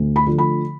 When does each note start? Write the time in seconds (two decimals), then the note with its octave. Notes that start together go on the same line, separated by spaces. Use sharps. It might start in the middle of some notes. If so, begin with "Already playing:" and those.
Already playing: D2
0.16 B5
0.26 D3 F3 A3
0.38 B5